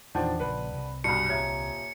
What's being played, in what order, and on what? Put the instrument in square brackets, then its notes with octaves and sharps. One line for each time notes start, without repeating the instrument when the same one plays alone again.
[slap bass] E2 A#2 [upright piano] D#3 F3 D4 [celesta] D5 F#5 A5
[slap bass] A#1 A#2 C#3 [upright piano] B4
[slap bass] C2
[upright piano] B1 G2 [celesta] A5 C7 [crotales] C#7
[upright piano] D#1 G#6 [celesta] C#5 E5 A#5